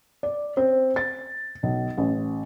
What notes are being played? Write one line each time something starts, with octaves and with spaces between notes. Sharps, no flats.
D5
C4
A6
B1
A1